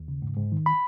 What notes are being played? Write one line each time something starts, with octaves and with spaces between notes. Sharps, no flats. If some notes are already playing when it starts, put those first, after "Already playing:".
Already playing: D#2
C#3
G#2
G#2
D#3
B5